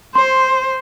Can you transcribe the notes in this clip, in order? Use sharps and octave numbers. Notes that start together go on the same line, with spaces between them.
C5 C6